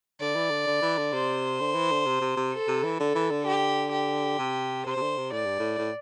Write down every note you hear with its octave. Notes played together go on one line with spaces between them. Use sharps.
D3 D5
E3
D3
D3
E3
D3
C3 C5
D3
E3
D3
C3
C3
C3
A4
C3
E3
D3 A4
E3
D3
G4
G4
C3
C3 C5
C3
D3
C3
A2 D5
G2
A2
A2